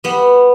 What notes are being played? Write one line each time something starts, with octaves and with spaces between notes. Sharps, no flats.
G3 B3